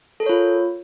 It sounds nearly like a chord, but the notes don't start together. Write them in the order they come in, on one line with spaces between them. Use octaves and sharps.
A4 A#4 C#5 F4